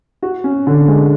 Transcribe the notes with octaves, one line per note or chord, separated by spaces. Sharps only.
F#4
C#4
D3
G#3